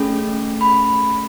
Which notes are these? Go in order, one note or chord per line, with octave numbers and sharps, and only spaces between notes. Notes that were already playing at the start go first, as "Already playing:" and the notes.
Already playing: A3 C#4 G#4
B5